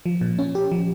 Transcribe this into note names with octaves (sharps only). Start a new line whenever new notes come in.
F3
A#2
C#4
G4
F3